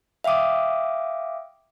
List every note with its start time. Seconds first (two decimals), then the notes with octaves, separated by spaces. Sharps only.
0.24 E5 F5 G5 D6 D#6